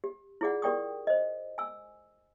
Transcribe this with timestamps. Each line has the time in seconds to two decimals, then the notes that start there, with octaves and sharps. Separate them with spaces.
0.04 G4
0.41 E4 F4 G#4 D5 F#5
0.62 G4 A#4 D5 G5 C#6 D#6
1.07 C5 D#5
1.58 G#5 E6